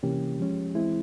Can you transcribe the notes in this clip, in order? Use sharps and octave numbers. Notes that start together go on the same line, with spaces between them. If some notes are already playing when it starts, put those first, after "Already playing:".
C3 E3 A#3 C#4 G4
F3 G#3 C#4
E3 G#3 C4 E4